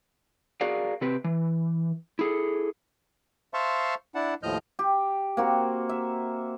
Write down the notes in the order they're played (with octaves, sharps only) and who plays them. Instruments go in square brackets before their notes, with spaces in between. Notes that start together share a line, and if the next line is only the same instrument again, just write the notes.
[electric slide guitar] F#4 G#4 A#4 D5 F5
C3 C4 G4 B4
E3
E4 G#4 A4
[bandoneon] C5 E5 F5 A5 C6 C#6
D4 E4 F#5 A5
D#2 A2 F3 D#5 F6 G6
[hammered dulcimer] G4
A#3 C4 F#4
E5